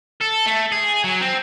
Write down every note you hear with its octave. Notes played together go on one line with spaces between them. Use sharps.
A4
A3
G#4
F#3
C4